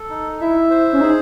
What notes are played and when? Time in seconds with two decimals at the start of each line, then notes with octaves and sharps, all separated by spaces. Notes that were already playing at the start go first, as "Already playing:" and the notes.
Already playing: A4
0.10 D#4
0.41 E4 E5
0.70 C5
0.93 C#4
1.01 D#4 G#4